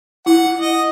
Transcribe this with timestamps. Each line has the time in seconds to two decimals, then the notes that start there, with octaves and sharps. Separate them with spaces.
0.26 E4 F#5
0.60 D#5